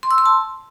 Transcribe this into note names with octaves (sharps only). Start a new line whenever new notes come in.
C6
E6
C6
A5